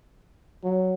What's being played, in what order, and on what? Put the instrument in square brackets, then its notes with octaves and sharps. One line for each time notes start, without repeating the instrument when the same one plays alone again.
[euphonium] F#3